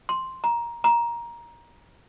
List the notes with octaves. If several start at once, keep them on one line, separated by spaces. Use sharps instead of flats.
C6
A#5
A#5